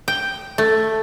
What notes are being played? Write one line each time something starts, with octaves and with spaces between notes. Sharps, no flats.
G5
A3